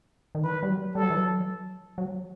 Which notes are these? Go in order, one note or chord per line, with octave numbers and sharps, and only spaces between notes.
D#3
E3 B4
G3
F#3
G3 A4
F#3
E3
F#3
F#3